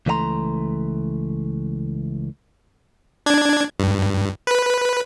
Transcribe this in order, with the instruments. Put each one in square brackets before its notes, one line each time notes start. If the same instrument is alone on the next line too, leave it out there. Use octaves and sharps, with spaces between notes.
[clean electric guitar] C#2 E3 A3 D#5 A#5 C6
[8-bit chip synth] D4 G#6
G2
B4